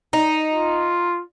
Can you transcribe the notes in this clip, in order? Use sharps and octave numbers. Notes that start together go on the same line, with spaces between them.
D#4
F4